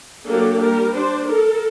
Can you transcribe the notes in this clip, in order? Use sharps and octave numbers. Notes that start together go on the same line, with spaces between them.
F#3 A#3 D4 G4 A4
G3 A#4
D4 C5
A4 A#4